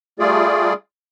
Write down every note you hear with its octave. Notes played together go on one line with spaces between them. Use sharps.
G3 A3 F4 G#4 D5